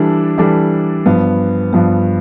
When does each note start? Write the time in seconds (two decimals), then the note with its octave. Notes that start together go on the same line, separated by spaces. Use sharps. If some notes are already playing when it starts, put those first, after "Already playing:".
Already playing: E3 G3 D4 A4
0.38 E3 G3 D4 A4
1.06 G2 F3 B3
1.73 G2 F3 B3